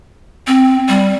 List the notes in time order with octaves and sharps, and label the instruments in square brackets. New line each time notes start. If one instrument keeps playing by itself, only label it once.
[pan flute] C4
G3